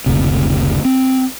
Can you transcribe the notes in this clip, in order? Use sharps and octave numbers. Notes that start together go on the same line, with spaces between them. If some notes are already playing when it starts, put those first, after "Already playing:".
F#1 D2 C3
C4